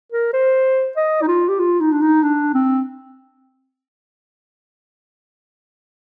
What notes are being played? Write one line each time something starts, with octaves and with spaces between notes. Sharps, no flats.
A#4
C5
D#5
D#4
F4
G4
F4
D#4
D4
D#4
D4
C4